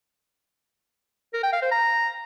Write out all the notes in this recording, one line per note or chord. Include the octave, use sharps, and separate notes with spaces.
A#4
G5
F5
C5
A#5